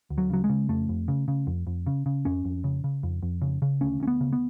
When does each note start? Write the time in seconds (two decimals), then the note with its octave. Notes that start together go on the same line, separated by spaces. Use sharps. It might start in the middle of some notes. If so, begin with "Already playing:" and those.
0.10 D2
0.18 F#3
0.30 C#3 F#3
0.44 G#3
0.49 C#3
0.69 F2 A3
0.89 F2
1.08 C#3
1.28 C#3
1.47 F2
1.67 F2
1.86 C#3
2.06 C#3
2.25 F2 C#4
2.45 F2
2.64 C#3
2.84 C#3
3.03 F2
3.23 F2
3.42 C#3
3.62 C#3
3.81 D2 C#4
4.00 D2 C#4
4.07 B3
4.21 C#3
4.33 B3